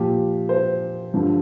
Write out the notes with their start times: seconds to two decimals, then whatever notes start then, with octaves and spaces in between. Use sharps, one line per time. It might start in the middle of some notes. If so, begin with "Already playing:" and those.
Already playing: A#2 F3 G4
0.49 C5
1.14 G2 D3 F3